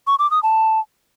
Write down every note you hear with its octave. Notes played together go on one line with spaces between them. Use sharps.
C#6
D6
D#6
A5